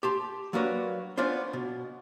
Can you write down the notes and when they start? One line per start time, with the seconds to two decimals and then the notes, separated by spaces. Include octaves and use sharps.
0.03 G4 A5 C6
0.53 F#3 A#3 D4 F#4 B4 C#5
1.17 B3 C#4 D4 F4 C5
1.53 B2